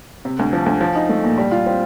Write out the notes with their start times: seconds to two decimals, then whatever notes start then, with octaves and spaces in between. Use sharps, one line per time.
0.25 C3
0.39 D2
0.53 F3
0.66 D2
0.81 F3
0.96 D#4
1.09 A3
1.24 A#2
1.38 G3
1.51 F4
1.66 C4